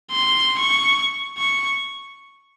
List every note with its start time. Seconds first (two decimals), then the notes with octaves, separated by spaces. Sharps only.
0.11 C6
0.59 C#6
1.38 C#6